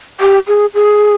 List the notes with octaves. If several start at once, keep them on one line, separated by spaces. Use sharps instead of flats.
G4
G#4
G#4